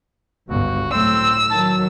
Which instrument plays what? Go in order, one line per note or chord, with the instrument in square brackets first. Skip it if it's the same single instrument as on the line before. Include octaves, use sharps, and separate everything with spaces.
[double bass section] G1 C#2 G2 [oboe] F#4
[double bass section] A2 F#3 A3 [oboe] C4 [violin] E6
[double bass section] D#3 F#3 [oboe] A5